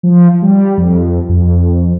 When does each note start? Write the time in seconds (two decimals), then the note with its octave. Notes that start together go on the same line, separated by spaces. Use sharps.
0.03 F3
0.42 G3
0.77 F2
1.29 F2